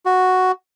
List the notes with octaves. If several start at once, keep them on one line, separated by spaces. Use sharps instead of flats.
F#4